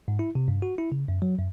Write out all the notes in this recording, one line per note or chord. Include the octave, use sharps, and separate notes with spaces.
G#2
E4
C3
G2
F#4
E4
C#3
F#2
F#3
F#2